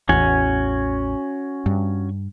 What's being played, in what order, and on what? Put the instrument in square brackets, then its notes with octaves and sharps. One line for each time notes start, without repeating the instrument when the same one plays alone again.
[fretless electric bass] A1 E2 [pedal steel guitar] C#4 F#4 G#5
[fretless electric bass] G2